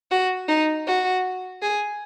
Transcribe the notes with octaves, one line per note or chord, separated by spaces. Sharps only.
F#4
D#4
F#4
G#4